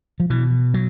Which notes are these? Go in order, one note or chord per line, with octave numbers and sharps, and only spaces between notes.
F3
B2 E3
F#3